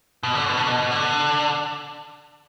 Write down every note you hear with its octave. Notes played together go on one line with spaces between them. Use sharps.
B2
D3
B2
D3
B2
D3